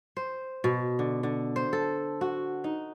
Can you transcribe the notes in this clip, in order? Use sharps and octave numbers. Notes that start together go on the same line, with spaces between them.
C5
B2
D3
D3
C5
A4
F#4
D#4